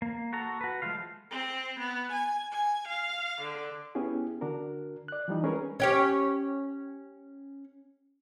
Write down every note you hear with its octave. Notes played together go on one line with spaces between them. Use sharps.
A#3
F#4 A4 A#5
F#4 B4
F3 G#3 A3 F4 F5
C4
B3
G#5
G#5
F5
D3
B3 C#4 E4 G4 G#4
D3 D4 F#4 A#4
D5 F#6
E3 F3 G3 D#4
G#3 C#4 G#4 A#4 B4 C#5
C#4 G4 C#5